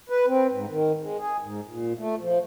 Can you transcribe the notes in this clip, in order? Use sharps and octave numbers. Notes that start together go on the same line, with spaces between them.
B4
C4
G#2
D#3
G#3
G#4
G#2
A#2
A3
F3